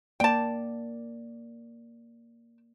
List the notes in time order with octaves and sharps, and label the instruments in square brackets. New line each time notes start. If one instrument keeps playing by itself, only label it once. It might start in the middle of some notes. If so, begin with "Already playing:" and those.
[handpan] A#3 D5 [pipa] G5 A5